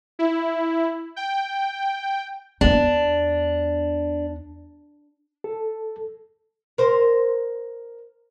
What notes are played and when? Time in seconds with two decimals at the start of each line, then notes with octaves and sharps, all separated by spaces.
0.19 E4
1.16 G5
2.61 E2 B3 D4
5.44 A4
6.78 A#4 C5